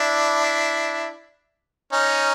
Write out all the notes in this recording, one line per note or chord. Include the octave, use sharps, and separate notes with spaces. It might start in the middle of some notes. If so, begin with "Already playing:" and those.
Already playing: D4 E4
C#4 D#4